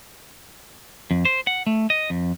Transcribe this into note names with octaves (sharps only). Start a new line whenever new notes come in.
F2
C5
F#5
A3
D#5
F2